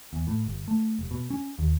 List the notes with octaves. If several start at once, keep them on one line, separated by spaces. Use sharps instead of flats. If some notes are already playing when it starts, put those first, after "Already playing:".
E2
A2
G1
A3
F1
B2
C#4
D#2